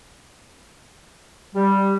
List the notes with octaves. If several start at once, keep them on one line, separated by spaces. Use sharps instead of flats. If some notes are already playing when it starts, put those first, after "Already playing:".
G3